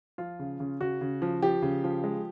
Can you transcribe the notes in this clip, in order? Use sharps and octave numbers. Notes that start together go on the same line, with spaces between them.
F3 F4
C#3
C#3
C#3 F#4
C#3
F3
F3 G4
C#3
F3
G#3